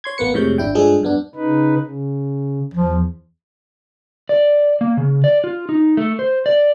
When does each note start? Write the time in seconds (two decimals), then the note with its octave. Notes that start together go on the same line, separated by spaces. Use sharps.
0.04 C#5 C6 G#6
0.18 A1 A#3 B3 B4 C#7
0.34 F2 A2 C3 G#3 C#5 G6
0.58 G#1 D4 E4 G5
0.75 G2 F3 G#3 D4 G#4 A4
1.03 G2 B3 D4
1.35 C#3 D#4 B4
1.79 C#3
2.74 E2 F3
4.29 D5
4.81 A#3
4.97 C#3
5.24 D5
5.44 F4
5.69 D#4
5.97 A3
6.19 C5
6.46 D5